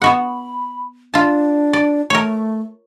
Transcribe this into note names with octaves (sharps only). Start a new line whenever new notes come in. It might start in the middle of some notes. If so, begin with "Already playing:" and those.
B3 F#4 F#5 B5
D4 F4 A5
D5
A3 A#4 C#5